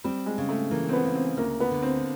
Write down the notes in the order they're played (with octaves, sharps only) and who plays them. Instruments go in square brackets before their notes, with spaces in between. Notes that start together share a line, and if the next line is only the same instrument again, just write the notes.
[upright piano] G3 [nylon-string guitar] C4
[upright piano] G#3
[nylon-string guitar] C#3
[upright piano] A3
[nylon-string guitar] E3 [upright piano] A#3
[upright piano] C4
B3
[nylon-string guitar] C#3
[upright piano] C4
[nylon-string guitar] D2 [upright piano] A#3
[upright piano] B3
[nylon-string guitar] D3
[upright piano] C4